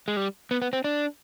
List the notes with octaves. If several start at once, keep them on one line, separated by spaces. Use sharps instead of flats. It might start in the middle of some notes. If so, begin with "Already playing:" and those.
G#3
G3
B3
B3
C4
D4